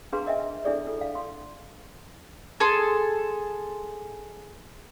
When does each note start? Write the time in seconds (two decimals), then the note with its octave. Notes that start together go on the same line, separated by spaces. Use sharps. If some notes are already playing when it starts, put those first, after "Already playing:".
0.13 D4 G#4 B4 F5 A#5 C6
0.26 A#4 D#5 E5 G#5
0.65 D4 E4 G#4 A4 D5
0.87 F4 A4
1.01 F5
1.15 C6
2.60 G#4 A4 A5 C6